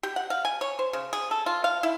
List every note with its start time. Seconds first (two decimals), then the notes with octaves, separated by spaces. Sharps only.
0.03 G4
0.16 F#5
0.30 F5
0.45 G#5
0.61 C#5
0.79 C5
0.93 C#3
1.13 G#4
1.31 A4
1.46 F4
1.64 F5
1.83 E4